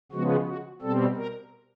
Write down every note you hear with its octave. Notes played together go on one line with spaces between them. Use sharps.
C#3 F3 G#3 B3 F#4
F#4
B2 G3 C4 A4
A#4